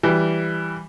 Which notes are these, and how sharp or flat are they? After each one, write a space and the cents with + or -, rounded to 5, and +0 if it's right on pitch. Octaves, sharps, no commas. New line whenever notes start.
E3 +5 G3 +0